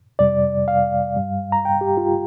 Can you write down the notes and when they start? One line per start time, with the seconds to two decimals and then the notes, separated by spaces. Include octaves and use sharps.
0.19 F2 C3 G3 D5
0.68 F5
1.17 G2 G3
1.52 A#5
1.65 G5
1.81 G4
1.97 F4